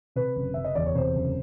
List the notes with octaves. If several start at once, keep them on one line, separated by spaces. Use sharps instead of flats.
C3 B4
F#1
F#1 E5
D#5
E2 D5
C#5
C3 C5
F#1